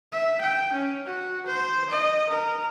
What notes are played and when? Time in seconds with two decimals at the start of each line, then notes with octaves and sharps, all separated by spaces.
0.12 E5
0.41 G5
0.73 C#4
1.05 F#4
1.46 C5
1.90 D#5
2.29 A#4